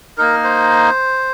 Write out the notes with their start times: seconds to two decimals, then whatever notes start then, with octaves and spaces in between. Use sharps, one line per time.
0.18 A#3 D#4 A#4
0.44 C5